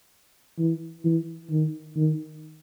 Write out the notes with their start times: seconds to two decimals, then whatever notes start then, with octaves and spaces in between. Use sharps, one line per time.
0.59 E3
1.04 E3
1.51 D#3
1.96 D#3